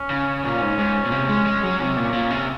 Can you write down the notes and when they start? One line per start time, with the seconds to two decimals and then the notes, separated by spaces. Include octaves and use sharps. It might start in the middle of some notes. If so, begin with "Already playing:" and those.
Already playing: C#4
0.10 C#3
0.44 A#2 C#4
0.61 G#2
0.78 G#2
1.06 A#2
1.12 C3
1.29 G#3
1.45 G#3
1.63 F#3
1.79 C3 C#4
1.97 A#2
2.13 A#2
2.30 C3